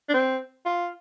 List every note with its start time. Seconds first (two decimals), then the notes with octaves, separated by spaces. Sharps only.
0.09 D4
0.14 C4
0.65 F4